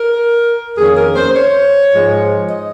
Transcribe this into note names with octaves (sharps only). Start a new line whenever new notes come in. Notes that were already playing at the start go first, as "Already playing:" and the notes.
Already playing: A#4
F2 D#3 A#3 C#4 G#4
A#4
C5
C#5
G#2 F3 G#3
D#5